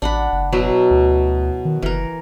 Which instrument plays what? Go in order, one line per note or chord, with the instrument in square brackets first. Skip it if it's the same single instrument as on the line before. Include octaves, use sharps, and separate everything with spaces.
[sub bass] A1 [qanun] D4 F#5 B5
[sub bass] F#1
[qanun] B2 F#3 E4
[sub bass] D2
D#3
[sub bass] F#1 [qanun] E3 A#4